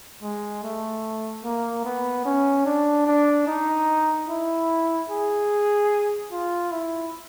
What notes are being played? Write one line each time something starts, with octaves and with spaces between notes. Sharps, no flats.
G#3
A3
A#3
B3
C#4
D4
D4
D#4
E4
G#4
F4
E4